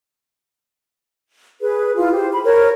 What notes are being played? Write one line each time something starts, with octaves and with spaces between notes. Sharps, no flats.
G#4 B4
E4 F4 G#4
G4 C5
B5
A#4 C5 C#5